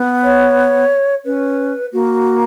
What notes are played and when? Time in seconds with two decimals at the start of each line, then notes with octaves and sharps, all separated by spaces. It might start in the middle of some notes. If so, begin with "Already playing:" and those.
Already playing: B3
0.24 C#5
1.25 C#4 B4
1.93 A#3 F#4